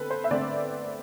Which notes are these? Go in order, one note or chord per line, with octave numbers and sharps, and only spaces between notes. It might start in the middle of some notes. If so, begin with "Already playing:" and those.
Already playing: D3 C4 A4 B4
C5
E5
D3 A3 C4 D5